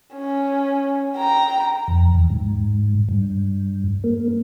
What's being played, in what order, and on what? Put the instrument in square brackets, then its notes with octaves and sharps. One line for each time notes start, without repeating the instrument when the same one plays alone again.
[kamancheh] C#4
G5 A#5
[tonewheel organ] F2
E2
G#2
G2
A#3